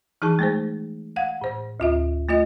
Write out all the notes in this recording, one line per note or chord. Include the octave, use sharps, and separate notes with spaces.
E3 D#4 G#4 A5 C#6
G#3 A3 G#4 C5
F5 F#5 G#6
A2 C5
D2 F4 E5
A3 F4 D#5